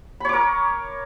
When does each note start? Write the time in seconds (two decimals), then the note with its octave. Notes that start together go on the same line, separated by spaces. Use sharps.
0.20 B5
0.25 C#5
0.29 D6
0.33 A#4